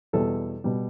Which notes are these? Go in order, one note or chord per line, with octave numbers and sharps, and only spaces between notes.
E2 B2 G3 A4
B2 G3